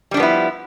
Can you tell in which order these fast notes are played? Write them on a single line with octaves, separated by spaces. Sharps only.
G3 D4 F3 B3 E4